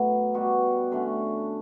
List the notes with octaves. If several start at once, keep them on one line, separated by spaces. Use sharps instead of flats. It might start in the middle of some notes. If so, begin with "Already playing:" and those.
Already playing: A2 F#3 B3
B2 G3 B3 F#4
D3 A3 C#4